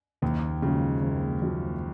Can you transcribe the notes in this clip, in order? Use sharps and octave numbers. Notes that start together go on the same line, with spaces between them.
F#1 D#2 D#3
F#2 C#3 F3 G#3
F#1
F#2 F3 G#3